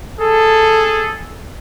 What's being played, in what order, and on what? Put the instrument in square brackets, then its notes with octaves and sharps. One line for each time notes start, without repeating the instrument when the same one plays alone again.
[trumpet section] G#4 A4